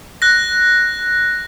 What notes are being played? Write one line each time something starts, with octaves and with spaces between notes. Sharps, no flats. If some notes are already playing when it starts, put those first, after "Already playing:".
F#6 A#6